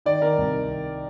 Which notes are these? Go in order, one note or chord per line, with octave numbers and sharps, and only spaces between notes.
D#3 D5
D#3 A#4
C2